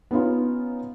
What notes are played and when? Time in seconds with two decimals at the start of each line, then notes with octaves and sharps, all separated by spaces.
0.11 B3 C#4 D#4 F4